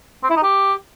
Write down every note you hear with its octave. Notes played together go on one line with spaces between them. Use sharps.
C4
E4
D#4
G4